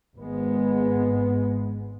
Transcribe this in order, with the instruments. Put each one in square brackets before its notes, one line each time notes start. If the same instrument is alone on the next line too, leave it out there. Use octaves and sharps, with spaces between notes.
[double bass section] G#1 G#2 G#3 B3